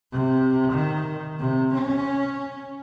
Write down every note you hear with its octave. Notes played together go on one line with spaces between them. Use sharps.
C3
D#3
C3
C#4